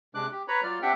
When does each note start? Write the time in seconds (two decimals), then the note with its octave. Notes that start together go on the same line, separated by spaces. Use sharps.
0.15 C3 G#3 D4 D6 F#6
0.32 G4
0.48 B4 C#5 A#5 B5
0.63 F#3 F4 D5 F6
0.82 C4 D4 G4 E5 F#5 G5